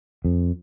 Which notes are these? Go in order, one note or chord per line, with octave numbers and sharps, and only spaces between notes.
F2